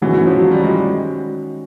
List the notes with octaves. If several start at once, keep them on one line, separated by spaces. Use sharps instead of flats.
D#3 E3 G#3 C#4 F#4
E3
F3
F#3
G3
G#3